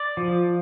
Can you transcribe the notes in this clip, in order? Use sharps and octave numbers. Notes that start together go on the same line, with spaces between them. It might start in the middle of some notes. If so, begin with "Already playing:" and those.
Already playing: D5
F3